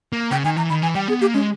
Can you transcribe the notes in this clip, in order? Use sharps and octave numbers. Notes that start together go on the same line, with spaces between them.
A#3
C#3 G5
D#3 G#5
E3 A#5
D#3 B5
E3 G#5
G3 G5
B3 G#4
A#3 G4
G#3 C#4